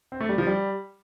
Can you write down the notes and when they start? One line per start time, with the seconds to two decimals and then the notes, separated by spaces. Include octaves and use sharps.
0.12 C4
0.21 A3
0.29 G3
0.38 F3
0.47 G3